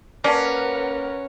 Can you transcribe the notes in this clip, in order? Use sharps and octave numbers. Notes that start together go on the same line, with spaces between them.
A#3 C#4 A#4 B4 D5 F#5 A5